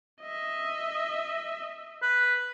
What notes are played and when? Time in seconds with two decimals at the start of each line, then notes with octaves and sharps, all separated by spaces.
0.22 D#5 E5
2.02 B4